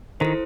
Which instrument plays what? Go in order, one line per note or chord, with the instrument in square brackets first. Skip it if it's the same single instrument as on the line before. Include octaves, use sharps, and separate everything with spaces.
[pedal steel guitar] D#3 [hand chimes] E4 A4 C5